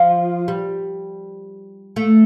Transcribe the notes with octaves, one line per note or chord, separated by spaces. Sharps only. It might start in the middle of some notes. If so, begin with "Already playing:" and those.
Already playing: F3
G3
A3